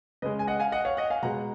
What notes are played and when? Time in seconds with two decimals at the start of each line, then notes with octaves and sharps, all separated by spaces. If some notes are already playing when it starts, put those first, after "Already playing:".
0.22 C#3 G#3 B4 D#5
0.39 G#5
0.47 D#5 F#5
0.60 F5 G#5
0.72 D#5 F#5
0.85 C#5 F5
0.97 D#5 F#5
1.10 F5 G#5
1.23 B2 G#3 F#5 A#5